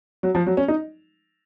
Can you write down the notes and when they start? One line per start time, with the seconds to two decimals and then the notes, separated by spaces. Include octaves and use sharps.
0.23 F#3
0.35 F3
0.47 F#3
0.57 C#4
0.68 D#4